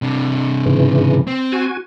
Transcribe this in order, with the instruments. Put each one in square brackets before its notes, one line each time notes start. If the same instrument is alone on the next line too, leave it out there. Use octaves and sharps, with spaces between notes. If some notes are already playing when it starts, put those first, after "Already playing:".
[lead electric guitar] C3 D4
[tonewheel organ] G#2 C#3 E3
[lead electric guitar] C4
[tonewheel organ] F#4 G#5